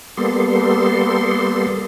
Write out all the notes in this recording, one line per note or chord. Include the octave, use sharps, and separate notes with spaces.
G3 A#3 B3 A4 C6